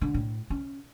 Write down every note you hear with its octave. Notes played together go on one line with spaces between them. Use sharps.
D3
A2
C#4